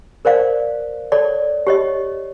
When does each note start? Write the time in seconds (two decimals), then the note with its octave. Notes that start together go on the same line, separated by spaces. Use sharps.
0.25 A#4 C5 D5 F5
1.12 A4 C#5 D5
1.67 G4 C#5 D#5